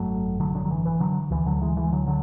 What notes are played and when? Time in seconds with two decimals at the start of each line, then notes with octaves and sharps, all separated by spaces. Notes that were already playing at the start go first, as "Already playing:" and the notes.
Already playing: G#1 F#2 F#3 A3
0.40 D3 F#3
0.55 D3 F#3
0.65 F#3
0.71 E3
0.85 E3
1.00 D3 F#3
1.30 D2 D3 E3
1.46 D3 F#3
1.62 E3 G#3
1.77 E3 G#3
1.92 D3 F#3
2.06 D3 F#3